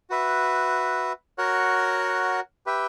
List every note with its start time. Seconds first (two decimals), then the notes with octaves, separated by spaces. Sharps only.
0.10 F#4 B4 E5
1.38 F#4 A#4 C#5 F#5
2.66 G4 B4 E5 G5